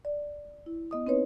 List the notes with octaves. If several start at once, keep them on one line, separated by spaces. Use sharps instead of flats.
D5
E4
B3 D#5 D#6
C4 D#4 B4 C#5